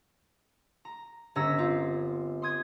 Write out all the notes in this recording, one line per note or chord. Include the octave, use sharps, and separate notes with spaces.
A#5
G1 C#4 A#5 E6 A#6 B6
C4 F4
C6 D#6 G#6